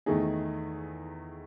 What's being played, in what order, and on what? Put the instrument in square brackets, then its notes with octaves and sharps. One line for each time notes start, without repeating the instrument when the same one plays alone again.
[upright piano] E2 D#3 A3 D#4 G#4